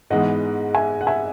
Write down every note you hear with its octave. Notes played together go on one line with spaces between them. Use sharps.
G#2 E3 G#3 B3 D#4 D#5 F#5
E5 G#5
F#5
E5 G#5